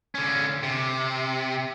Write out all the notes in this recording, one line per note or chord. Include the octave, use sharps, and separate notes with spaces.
D3 C#4
C3